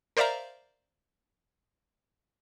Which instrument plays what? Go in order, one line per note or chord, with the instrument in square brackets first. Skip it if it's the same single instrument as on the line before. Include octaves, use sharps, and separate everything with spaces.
[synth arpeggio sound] A#4 C5 D5 E5 F5 A#5